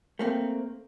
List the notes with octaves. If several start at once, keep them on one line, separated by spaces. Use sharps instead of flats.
A3 A#3 C4